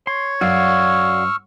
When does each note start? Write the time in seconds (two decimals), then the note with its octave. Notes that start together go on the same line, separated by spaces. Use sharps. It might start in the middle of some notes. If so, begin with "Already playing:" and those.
0.07 C#5 C6
0.41 F#2 F#4 D5 F5 C#6 E6 F6